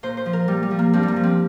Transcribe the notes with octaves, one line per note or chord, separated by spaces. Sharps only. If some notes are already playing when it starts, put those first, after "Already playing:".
A#2 C5
C5
F3
A#4
A#2 G3
G3
F3
A#3
G2 C4
G3
A#3
F3
C4